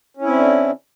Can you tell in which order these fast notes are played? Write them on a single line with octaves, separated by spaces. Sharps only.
C#4 E4 C4 D3